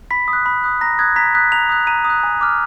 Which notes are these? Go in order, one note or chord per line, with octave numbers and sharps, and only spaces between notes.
B5 B6
D#6
F#6
B5
D#6 F#6
A#5 A#6
D#6 F#6 G#6
A#5 B6
D#6 F#6 B6
A#5 F7
D#6 F#6
A#5 D#7
D#6
F#6
G#5
D6 F6